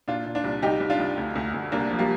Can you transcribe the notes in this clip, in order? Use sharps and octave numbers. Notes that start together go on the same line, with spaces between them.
A#2 D4 F4
A#2
D4 F4
C2
C2 D#4 G4
C2
D4 F4
C2
D2
D2
D2
C2 A#3 D4
F3
G3 A#3